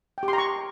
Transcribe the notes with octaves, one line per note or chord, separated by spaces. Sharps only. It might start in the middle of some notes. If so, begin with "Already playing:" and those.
G5
G4
C6
A#5
C#6